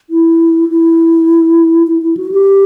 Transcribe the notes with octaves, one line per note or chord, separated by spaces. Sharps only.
E4
E4
E4
E4
F#4
G4